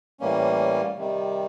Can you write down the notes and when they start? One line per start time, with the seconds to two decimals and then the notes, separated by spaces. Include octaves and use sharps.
0.20 A2 E3 G3 A#3 C#4
0.97 C3 D#3 G3